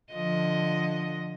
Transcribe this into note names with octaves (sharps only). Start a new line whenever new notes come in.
D3 F3 D#5